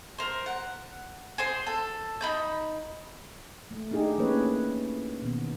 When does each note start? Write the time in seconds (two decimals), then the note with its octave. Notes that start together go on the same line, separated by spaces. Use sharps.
0.18 A#4 C5
0.46 F#5
1.38 G#4 C5 C6
1.67 A4
2.21 D#4 B5 G6
3.71 A3
3.91 D4 D#4 G4 G#4
4.18 E3 A3 A#3 C#4 B4 C#5
5.22 B2 D#3 B3